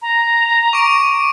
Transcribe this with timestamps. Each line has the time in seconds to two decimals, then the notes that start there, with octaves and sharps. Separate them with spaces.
0.02 A#5
0.73 C#6 D6 D7